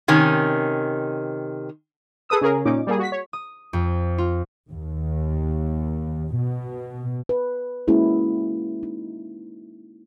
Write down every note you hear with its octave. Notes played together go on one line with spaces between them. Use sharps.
C3 D#3 C#4
G#4 A4 B4 D#6 E6
C#3 C#4 G#4 A#4
A#2 C#4 D#4 D6
G3 A#3 G#4
F#4 B6
C#5
D#6
F2
F4
D#2
B2
B4
G#3 A#3 C#4 E4 F#4 G#4
D#4